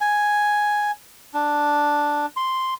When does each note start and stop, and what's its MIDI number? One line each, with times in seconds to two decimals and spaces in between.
0.01 0.91 80
1.34 2.26 62
2.37 2.74 84